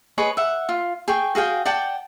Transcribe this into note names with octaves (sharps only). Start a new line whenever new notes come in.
G#4 B4 C#5 D#5
E5 F#5
F4
G#4 G5 C#6
F#4 G#4 F5 G5
D5 F#5 G5 A5